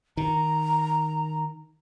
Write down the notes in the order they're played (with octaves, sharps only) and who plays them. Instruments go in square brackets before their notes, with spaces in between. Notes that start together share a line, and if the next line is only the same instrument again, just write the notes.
[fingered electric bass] D#3 [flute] A#5